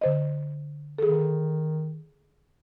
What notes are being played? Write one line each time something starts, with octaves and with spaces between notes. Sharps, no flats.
D3 C5 D#5
D#3 G#4 A4